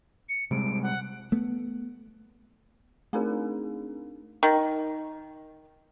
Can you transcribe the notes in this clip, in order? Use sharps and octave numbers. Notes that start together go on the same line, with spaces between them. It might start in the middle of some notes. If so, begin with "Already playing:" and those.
C#7
C3 G3 G#3 D7
F#5
A3 B3
A3 C4 D4 D#4 G#4 A#4
D#3